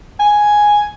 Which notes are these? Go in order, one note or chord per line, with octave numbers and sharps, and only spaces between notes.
G#5